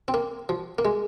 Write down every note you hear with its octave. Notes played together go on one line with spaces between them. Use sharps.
C4
A#3
F3
A#3
G#3